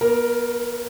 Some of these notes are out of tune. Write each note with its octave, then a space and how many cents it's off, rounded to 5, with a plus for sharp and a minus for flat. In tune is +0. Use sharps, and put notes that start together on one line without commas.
B3 -40 A#4 +0